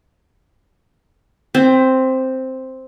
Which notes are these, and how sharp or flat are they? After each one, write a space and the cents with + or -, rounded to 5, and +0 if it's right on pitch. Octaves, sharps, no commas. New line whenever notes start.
C4 +0 G4 +35